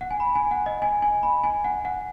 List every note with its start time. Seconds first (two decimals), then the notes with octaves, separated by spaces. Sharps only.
0.01 F#5
0.11 G#5
0.20 B5
0.35 G#5
0.51 F#5
0.66 D#5
0.82 G#5
1.02 G#5
1.23 B5
1.44 G#5
1.64 F#5
1.85 F#5